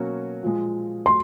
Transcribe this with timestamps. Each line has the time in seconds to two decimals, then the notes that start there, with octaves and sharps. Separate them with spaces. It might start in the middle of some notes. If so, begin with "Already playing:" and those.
Already playing: B2 F#3 A#3 C#4 F#4
0.43 A#2 F3 G#3
1.06 F#3 A3 C6